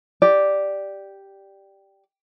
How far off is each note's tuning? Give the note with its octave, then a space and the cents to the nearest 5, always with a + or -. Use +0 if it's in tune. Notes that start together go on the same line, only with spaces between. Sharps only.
G4 +0 D5 +0